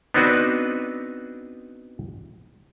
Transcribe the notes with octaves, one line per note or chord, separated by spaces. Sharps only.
B3 C4 D4 D#4 F#4 B4